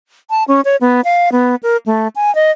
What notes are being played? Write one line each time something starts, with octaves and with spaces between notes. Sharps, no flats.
A5
C#4
C#5
B3
F5
B3
A#4
A3
G#5
D#5